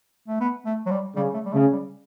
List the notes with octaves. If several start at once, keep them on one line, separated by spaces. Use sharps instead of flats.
A3
B3
A3
F#3
G3
C#3 G3
A3
G3
C#3 A3
G3